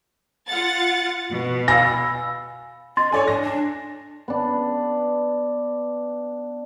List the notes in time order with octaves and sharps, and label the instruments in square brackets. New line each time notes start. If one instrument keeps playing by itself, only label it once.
[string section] F4 F#5 A6
B2
[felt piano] F5 A#6 [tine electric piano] G#5 B5 E6
[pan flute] D#5 [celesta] C6 A6
[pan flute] A4 [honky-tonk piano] C#5 D5 G#5
[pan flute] D4 [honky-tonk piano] A#6
[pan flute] D4
[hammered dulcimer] B3 D4